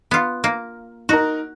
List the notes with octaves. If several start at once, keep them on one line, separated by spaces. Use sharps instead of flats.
B3 F4
A#3
D#4 F#4 A#4